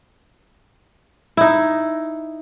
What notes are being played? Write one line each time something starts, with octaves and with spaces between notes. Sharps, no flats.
D#4 E4